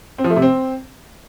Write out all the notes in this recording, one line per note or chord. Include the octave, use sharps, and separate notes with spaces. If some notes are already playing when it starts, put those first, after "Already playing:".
C4
F3
A3
C3
C4